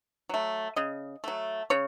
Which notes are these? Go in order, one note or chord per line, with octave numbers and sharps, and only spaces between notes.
F#3 A3
C#3 D#5
F#3 A3
C#3 C#5